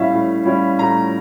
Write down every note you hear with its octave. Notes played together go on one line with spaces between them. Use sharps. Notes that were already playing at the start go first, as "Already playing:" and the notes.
Already playing: A2 G3 C#4 E4 E5 F5
A2
G3 C#4 E4
A2 A#5